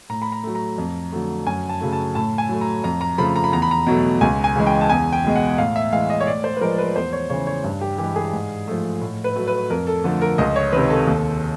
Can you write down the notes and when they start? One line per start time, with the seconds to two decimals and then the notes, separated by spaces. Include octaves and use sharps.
0.09 A2 A#5
0.22 B5
0.32 A#5
0.44 F#3 A3
0.55 A#5
0.78 F2
1.12 D3 F#3 A3
1.47 F#2 G#5
1.69 A5
1.81 C#3 F#3 A3
1.93 A5
2.15 A2 A5
2.38 G#5
2.49 F#3 A3
2.61 A#5
2.84 F2 A#5
3.01 A#5
3.18 C#3 F3 A3 B5
3.36 A#5
3.44 B5
3.52 E2 A#5
3.62 B5
3.71 A#5
3.87 B2 F#3 A3
4.21 C#2 G#5
4.44 G#5
4.56 C#3 E3 G#3
4.67 G5
4.81 A5
4.90 E2 G#5
5.13 G5
5.24 B2 G#3
5.36 F#5
5.58 A2 F5
5.76 E5
5.93 E3 G#3 F5
6.10 D#5
6.21 C#5
6.27 A2 D5
6.44 C5
6.57 B4
6.61 F3 G#3 A#4
6.78 B4
6.95 E2 C5
7.13 C#5
7.30 C#3 E3 C#5
7.47 C#5
7.64 G2
7.81 G4
7.98 E3 G#3 G4
8.16 G#4
8.33 G#2
8.68 F3 A3
9.02 A2
9.24 B4
9.36 F#3 A3
9.47 B4
9.70 F2 A#4
9.87 A4
10.04 D3 F3 A3
10.22 A#4
10.38 C#2 D#5
10.56 C#5
10.72 C3 D#3 B4
10.90 A4
11.07 D#2